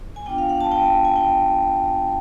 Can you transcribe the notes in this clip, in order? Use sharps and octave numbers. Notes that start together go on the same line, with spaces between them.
G#5
B3 D4 F4 G5
F5
F#5
A5
G5
G#5
G5